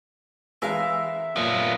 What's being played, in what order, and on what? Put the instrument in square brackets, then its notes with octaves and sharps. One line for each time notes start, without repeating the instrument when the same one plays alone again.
[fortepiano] E3 G#3 F5 [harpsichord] A#4 [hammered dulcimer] E5
[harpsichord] F#2 A#2 [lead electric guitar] B3 F4